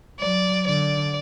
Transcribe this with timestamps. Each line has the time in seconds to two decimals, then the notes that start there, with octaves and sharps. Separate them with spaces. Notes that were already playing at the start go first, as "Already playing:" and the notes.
0.20 F#3 D5
0.67 D3 D5